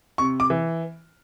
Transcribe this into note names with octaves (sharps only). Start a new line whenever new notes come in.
C3 C#6
D6
E3